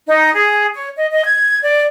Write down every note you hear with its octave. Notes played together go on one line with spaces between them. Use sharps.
D#4
G#4
C#5
D#5
D#5
G#6
D5